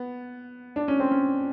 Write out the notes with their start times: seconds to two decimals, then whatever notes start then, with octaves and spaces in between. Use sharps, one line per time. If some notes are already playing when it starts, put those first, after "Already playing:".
Already playing: B3
0.76 D4
0.88 C#4
1.00 C4
1.12 C#4